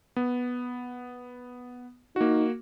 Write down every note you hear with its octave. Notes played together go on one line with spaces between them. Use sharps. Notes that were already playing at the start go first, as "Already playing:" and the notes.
B3
A#3 D#4 F#4